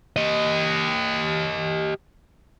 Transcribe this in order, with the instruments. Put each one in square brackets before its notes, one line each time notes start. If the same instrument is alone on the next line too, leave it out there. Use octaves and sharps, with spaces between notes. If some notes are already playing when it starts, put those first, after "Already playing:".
[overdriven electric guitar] G4 D#5